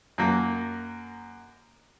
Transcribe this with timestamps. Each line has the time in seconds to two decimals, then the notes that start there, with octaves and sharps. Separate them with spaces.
0.18 F#2 A#3